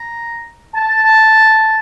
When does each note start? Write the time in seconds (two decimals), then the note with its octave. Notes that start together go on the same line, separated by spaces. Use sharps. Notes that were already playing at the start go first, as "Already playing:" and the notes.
Already playing: A#5
0.74 A5